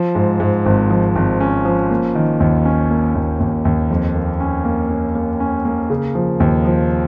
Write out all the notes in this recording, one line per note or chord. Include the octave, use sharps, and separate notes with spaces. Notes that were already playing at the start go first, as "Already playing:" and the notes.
Already playing: F3
G#2
G#2
G#1
F3
G#1
C#4
F3
A#3
D#3
D#2
C#4
A#3
D#2
D#2
D#2
F2
A#3
C#4
A#3
C#4
A#3
C#4
A#3
C#3
F3
D#2
F3